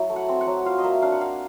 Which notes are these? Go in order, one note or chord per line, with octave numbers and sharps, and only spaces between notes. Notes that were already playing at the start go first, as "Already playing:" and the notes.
Already playing: F#3 E4
A3
F#5
C4
F#5
F#3
F4 F5
D#5
A#3 E5
D4 F5
F#5
A#3 F5